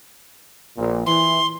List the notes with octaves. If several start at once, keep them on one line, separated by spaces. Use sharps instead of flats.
A#1 A#2
E3 C6